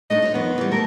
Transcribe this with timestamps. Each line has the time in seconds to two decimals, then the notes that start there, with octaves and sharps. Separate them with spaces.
0.10 A3 D4 D#4 D#5
0.22 F4 C5 C#5
0.34 F2 D#3 B3
0.58 E3 G3
0.71 A3 G4 A4 A#4